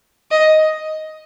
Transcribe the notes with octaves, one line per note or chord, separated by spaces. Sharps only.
D#5